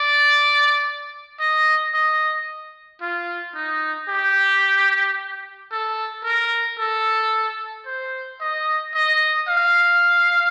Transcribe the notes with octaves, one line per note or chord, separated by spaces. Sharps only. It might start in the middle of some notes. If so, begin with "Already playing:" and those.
Already playing: D5
D#5
D#5
F4
D#4
G4
A4
A#4
A4
C5
D#5
D#5
F5